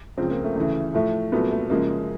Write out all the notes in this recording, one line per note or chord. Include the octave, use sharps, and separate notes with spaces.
C#2 C#3 F3 C4
A#3
A3
D2 C#3 E3
A2 F3 A3
C2 A#2 F#3 A3 B3
A3
F#2 C#3 F3 G#3 A#3